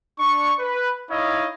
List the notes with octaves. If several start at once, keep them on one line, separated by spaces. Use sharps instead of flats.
D4 C#6
B4
D#4 E4 C#5 D#5 F5